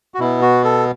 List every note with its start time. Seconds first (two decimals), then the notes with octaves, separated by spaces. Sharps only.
0.14 F#4
0.19 B2 B3 E4
0.42 F#4
0.64 A4